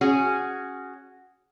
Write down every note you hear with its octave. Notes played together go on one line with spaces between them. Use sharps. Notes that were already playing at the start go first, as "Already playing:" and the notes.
C#4 F#4 G#4